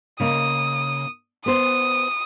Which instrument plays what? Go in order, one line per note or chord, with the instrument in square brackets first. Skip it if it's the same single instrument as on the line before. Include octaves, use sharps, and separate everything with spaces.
[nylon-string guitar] C#3 A#3 D#5 [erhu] D#6
[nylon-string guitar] B3 C5 [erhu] D#6